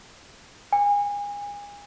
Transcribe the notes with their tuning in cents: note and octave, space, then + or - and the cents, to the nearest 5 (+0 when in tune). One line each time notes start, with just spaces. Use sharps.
G#5 -30